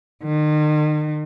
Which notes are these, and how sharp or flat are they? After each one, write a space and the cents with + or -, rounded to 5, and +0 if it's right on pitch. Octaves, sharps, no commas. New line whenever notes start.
D#3 -40